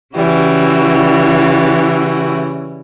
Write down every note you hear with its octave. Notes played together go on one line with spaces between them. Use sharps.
C#3 E3 G3 F#4